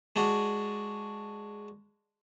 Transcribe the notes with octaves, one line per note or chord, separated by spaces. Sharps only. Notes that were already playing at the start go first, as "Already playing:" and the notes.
G#3 D4 F#4